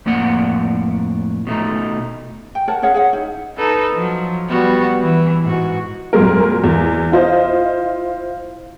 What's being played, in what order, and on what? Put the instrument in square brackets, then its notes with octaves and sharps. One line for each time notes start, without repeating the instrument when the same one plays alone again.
[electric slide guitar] F2 A2 A#3 D5 F#5
B2 A3 D#4
[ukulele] G5
A#4 C#5 F#5 A5
C#4 G#4 C#5 F#5
G#4 C#5 F#5
D#4 E4
[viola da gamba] D#4 A4 B4
F3 F#3
G3 B3 F#4
E3
G#2 F#4
[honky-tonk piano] F2 A#2 F#3 G#3 A#4
E2
E4 F4 C5 D#5